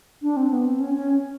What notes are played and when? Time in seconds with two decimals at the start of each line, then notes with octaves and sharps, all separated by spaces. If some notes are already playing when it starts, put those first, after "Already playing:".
0.22 D4
0.37 C4
0.50 B3
0.66 C4
0.80 C#4
0.94 C#4